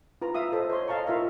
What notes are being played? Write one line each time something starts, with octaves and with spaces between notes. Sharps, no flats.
F4 B4 A#5
F4 E5 F5 D#6
A4 C5 D#5
C5 C#5 C6
D#5 F5 A5 A#5 C#6
F4 A#4 E5 F5